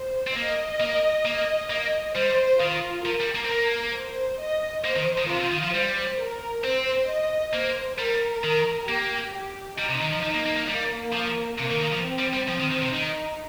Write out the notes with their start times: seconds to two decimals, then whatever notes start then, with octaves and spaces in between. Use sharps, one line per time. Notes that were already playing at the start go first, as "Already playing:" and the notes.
Already playing: C5
0.27 C4
0.35 A#3 D#5
0.80 A#3
1.25 A#3
1.70 A#3 D#5
2.15 G3 C5
2.60 D#3 F4
3.05 F3 A#4
3.20 G3
3.35 A#3
3.45 C4
3.50 A#3
3.94 C5
4.39 D#5
4.84 A#3 C5
4.96 D#3
5.18 D#3
5.29 C3 F4
5.41 C3
5.52 D#3
5.64 F3
5.75 G3 C5
6.20 A#4
6.64 C4 C5
7.10 D#5
7.54 A#3 C5
7.98 G3 A#4
8.44 D#3
8.89 A#3 G4
9.34 G4
9.78 G3 D#4
9.90 C3
10.01 D#3
10.13 F3
10.23 F3 D#4
10.35 A#3
10.46 A#3
10.57 A#3
10.69 G3 A#3
11.13 F3
11.58 C3 A#3
11.70 D#3
11.80 D#3
11.92 F3
12.03 C4
12.19 G3
12.33 G3
12.48 F3 C4
12.60 D#3
12.71 D#3
12.82 C3
12.93 D#3 D#4